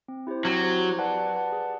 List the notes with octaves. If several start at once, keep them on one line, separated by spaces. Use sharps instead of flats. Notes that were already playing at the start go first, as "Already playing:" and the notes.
C4
E4 G4 C5
F#3 C4
E4 G4 C5
G4
B4 D5 F#5 A5
G4
B4 D5 F#5 A5
G#4